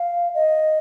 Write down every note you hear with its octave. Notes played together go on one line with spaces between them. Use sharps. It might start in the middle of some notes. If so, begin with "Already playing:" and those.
Already playing: F5
D#5